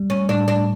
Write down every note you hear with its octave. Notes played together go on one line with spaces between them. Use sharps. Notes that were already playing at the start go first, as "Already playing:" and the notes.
Already playing: G3
C#4
A2 D4
D4